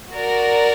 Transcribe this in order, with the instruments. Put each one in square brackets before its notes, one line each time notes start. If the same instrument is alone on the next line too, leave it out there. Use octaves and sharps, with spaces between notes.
[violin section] F#4 A#4 D5